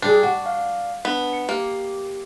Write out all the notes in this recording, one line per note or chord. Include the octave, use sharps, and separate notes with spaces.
G3 D4 G#4
F#4
F5
B3 D4 B6
C#7
A#3 G4